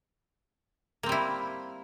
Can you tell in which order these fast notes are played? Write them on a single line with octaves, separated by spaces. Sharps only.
A#3 C4 G3 E4